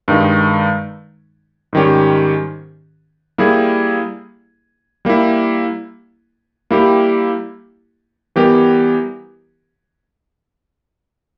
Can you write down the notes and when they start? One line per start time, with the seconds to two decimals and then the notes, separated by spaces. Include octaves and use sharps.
0.08 G2 D#3 G#3 D#4
1.73 G#2 D#3 G3 C#4 G4
3.38 G3 A#3 E4 G#4
5.05 G3 A#3 E4
6.71 G3 A#3 E4 G4
8.36 E3 G3 B3 G4 A#4